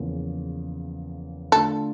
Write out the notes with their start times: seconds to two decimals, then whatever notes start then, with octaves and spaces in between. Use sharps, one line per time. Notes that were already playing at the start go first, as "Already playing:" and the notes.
Already playing: E2 C#3 F3 A#3
1.52 D3 A3 D4 F4 A4